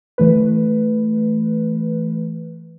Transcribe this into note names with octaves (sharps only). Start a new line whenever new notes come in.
E3 A3 B4